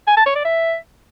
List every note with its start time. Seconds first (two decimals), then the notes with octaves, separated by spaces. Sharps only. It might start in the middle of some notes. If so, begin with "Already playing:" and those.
0.07 G#5
0.17 A5
0.26 C#5
0.36 D5
0.45 E5